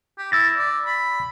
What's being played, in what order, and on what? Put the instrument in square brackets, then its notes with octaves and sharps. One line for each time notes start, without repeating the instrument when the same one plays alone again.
[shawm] G4
[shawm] E4 [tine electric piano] E6 A6 A#6
[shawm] D5
B5